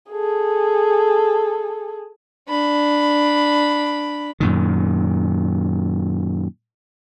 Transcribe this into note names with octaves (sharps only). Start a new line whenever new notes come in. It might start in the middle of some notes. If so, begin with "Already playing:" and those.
G#4 A4
D4 B5
F#2 A#2 D#3